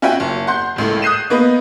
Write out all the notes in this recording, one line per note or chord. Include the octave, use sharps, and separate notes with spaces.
C#4 F4 F#4 E5 G5 G#5
F#1
F#5 C6 G6
F#1 C#2 A2
D#6 F#6 G6 C7 D#7 E7
A#3 B3 B4 D#5